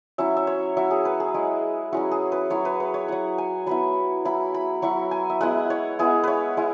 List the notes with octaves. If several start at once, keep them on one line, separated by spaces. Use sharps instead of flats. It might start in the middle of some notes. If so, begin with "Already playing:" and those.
F#3 C#4 E4 E5
E5
C#5
F#3 E4 E5
G#4
B4
G#4
G#3 E4
F#3 C#4 E4 F#4
G#4
B4
F#3 E4 C#5
B4
B4
C#5
F#3 E4 F#5
G#5
F#3 B3 E4 B5
F#3 E4 B5
B5
F#3 E4 C#6
G#5
E5
G#3 B3 E4 F#5
C#5
G#3 B3 E4 G#4
B4 C#5
G#3 E4